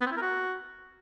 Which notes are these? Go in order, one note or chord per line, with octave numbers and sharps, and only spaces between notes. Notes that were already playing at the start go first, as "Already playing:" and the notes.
B3
C4
E4
A#4
F#4